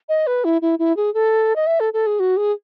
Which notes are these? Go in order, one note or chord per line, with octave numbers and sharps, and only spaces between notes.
D#5
B4
E4
E4
E4
G#4
A4
D#5
E5
A4
A4
G#4
F#4
G#4